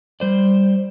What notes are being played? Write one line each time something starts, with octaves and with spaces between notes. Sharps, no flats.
G3 C5 D5